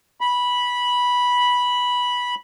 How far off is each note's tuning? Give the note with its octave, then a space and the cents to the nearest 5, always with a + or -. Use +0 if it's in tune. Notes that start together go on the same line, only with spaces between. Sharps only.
B5 -10